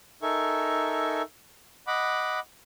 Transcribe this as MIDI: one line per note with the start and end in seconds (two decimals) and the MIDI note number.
0.22 1.22 63
0.22 1.22 69
0.22 1.22 70
0.22 1.22 76
0.22 1.22 80
0.22 1.22 85
1.87 2.40 75
1.87 2.40 78
1.87 2.40 83
1.87 2.40 86